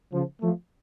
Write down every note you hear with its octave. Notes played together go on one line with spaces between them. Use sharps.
C#3 F3
F3 A3